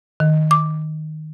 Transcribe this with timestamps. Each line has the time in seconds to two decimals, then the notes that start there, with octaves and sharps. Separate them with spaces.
0.20 D#3
0.51 D6